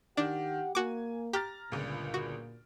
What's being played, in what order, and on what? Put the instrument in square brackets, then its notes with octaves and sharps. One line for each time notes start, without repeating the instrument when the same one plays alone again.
[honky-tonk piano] D#3 [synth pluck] D4 [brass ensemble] G4 F#5
[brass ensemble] A#3 [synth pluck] F#4 D6 [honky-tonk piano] G#5
[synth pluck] G4 [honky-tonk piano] A#5 F6 A6
[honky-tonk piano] G1 C#2 [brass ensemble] A#2
[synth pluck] F#4